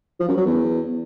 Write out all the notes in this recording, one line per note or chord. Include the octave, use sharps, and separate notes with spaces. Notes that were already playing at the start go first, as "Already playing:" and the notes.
F3
F#2
F#3
E2